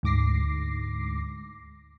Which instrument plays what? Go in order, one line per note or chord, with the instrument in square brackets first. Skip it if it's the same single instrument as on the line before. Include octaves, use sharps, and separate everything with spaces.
[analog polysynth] D2 G#2 D6 A#6 C7